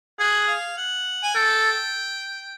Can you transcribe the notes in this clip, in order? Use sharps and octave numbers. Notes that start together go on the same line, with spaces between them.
G#4 F#5
F5
F#5
G#5
A4 G5